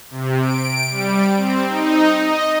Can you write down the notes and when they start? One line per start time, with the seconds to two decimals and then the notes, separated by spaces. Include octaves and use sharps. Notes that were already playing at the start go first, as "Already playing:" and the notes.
0.11 C3
0.41 D7
0.91 G3
1.36 C4
1.67 D#4
2.18 D#5